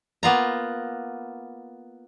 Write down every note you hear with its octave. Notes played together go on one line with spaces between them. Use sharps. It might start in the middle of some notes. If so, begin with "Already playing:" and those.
A#3 B3 F4 A#5